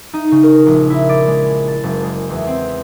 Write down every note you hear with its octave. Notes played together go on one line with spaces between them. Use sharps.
D#4
C#3
A#4
A#1
E4
D5
G#3
A5
F#1
G#3
E2
C4